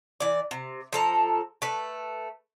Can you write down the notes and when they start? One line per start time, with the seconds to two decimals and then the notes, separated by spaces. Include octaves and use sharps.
0.20 E3 D5
0.51 C3
0.93 F3 A4 A#5
1.62 A3 B4